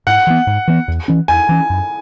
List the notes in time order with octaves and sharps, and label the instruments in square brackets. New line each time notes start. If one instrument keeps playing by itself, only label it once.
[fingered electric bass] G#2 [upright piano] F#5
[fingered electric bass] E3 B3
G#2
E3 B3
E2
E3 C#4
[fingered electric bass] E2 [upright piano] G#5
[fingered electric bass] E3 C#4
F#2